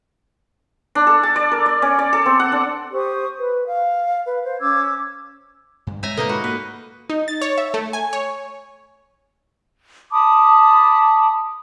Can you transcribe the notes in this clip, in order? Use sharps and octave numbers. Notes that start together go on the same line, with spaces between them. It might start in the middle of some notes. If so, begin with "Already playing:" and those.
D4
A4
A5
D5
A#4
D5
C#4
D5
A4
C4
F#5
D4
G4 C5 C#6 D#6
B4
F5
B4
C5 F5
C#4 D6 E6 G#6
G2
G#3 C#5 E5 G#5 A#5
B2 A#3 D#4 A4 B4 D#5
G#2 F4 F#4 B5
A#3 B4
D#4
A6
C#5
E5
A3
G#5
C#5
A5 B5 D6 D#6